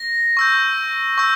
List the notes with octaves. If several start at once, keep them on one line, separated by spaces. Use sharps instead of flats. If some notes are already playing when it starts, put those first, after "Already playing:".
Already playing: A#6
C#6 E6 G6
C#6 E6 G6